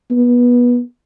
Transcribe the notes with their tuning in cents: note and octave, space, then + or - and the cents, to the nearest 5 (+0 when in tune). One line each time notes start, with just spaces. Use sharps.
B3 -20